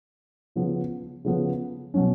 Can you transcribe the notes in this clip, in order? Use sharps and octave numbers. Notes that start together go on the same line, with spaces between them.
C#3 F3 B3
C#3 F3 B3
B2 F#3 C#4